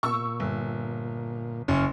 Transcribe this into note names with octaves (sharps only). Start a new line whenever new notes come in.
A#2 C#6 E6
G1
F#1 C#4